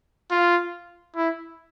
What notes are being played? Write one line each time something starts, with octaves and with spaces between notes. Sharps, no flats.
F4
E4